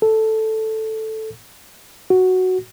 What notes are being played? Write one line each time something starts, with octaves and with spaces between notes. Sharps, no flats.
A4
F#4